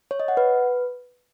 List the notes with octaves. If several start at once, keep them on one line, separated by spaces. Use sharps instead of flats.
C#5
D#5
F#5
B4